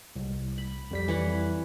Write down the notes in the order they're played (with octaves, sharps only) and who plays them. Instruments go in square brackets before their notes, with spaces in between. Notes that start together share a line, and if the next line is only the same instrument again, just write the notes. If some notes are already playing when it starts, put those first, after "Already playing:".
[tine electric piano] C2
[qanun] B5
[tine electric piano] F2 G3 B6
[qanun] E3 C#5 F#5